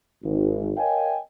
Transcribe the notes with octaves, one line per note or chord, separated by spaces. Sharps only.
G#1
A#4 C#5 D#5 F5 G5 G#5